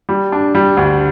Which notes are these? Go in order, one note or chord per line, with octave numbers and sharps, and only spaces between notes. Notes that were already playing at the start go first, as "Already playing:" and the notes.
G3
D4
G3
D2